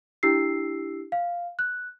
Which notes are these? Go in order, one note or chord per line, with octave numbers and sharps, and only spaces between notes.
D4 E4 G4 E6 C7
F5
F#6